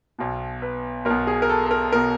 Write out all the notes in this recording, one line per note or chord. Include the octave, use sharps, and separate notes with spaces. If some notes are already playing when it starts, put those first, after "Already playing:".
B1 B2
B4
B1 B2 A#4
G#4
A#4
A4
A4
A#4
B2 A#4